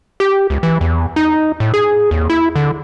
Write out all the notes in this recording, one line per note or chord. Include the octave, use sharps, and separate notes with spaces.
G4
C#2
E3
E2
D#4
A2
G#4
D#2
E4
D3